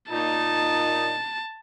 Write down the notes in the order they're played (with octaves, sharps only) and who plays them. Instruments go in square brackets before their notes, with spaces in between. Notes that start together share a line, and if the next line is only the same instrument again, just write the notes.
[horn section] A#2 D#4 [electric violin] A5